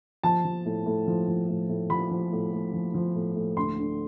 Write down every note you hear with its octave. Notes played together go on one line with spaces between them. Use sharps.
F3 A5
F3
A2
A2
F3
F3
A2
A2
F3 B5
F3
A2
A2
F3
F3
A2
A2
D2 C6
D3